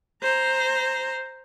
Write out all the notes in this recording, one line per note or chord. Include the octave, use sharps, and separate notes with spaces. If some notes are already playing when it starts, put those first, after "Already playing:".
C5 A#5